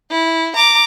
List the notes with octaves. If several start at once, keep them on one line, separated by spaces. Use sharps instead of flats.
E4
A#5 D6